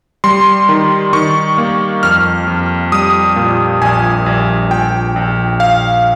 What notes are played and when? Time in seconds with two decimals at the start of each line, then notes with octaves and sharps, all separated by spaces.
0.24 G3 C6
0.69 D#3
1.13 D#3 C#6
1.58 A#3
2.03 F2 F6
2.48 F2
2.92 G3 D#6
3.36 A#2
3.81 A#1 G#5
4.26 A#1
4.71 A#1 G5
5.16 A#1
5.60 F5